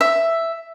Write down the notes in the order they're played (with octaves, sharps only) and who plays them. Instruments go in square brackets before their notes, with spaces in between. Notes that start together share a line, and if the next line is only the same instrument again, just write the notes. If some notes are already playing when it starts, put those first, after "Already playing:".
[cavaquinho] E5